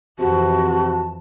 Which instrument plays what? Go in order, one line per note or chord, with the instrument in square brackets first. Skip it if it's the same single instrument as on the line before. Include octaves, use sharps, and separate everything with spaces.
[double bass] F2 E3 [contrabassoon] C3 [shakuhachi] F#4 [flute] A5